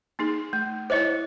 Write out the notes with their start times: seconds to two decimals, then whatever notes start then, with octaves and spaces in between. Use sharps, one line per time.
0.19 A#3 D#4 G#4
0.53 A3
0.90 E4 C5 C#5 D#5 D6